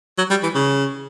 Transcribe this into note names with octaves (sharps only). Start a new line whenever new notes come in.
F#3
G3
E3
C#3